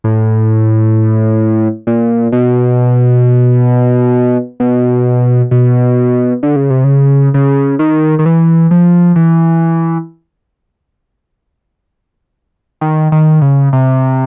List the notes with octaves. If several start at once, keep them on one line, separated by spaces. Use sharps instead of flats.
A2
A#2
B2
B2
B2
D3
C#3
C3
C#3
C#3
D#3
D#3
E3
F3
E3
D#3
D#3
C#3
C3